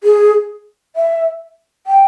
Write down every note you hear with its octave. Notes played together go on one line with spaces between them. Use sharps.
G#4
E5
G5